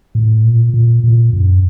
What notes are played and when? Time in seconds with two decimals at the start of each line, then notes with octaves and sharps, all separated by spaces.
0.15 A2
0.44 A#2
0.74 A#2
1.04 A#2
1.33 F#2